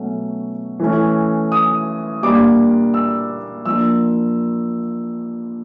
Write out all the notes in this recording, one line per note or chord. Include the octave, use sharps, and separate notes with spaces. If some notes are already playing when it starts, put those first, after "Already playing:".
Already playing: B2 F#3 A3 C#4
E3 A3 C#4
D#6
A#2 G3 A#3 D4 D6
E6
F3 A#3 D4 E6